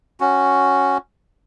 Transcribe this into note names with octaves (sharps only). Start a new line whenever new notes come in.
C#4 F#4